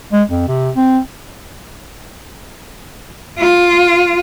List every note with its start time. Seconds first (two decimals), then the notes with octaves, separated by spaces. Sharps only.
0.12 G#3
0.29 F2
0.48 C3
0.75 C4
3.39 F4